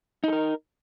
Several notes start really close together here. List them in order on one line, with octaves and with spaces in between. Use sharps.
D#4 A4 A#4